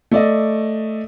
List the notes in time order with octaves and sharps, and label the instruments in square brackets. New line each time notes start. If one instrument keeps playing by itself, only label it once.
[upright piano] A3 D5 D#5